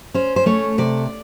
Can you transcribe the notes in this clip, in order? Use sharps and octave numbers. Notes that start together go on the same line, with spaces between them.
C#4 C5
C5
A3 C#5
C3 D5